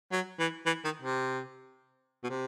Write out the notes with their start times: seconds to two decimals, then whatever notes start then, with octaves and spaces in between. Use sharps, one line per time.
0.12 F#3
0.39 E3
0.66 E3
0.84 D#3
1.02 C3
2.24 B2
2.30 C3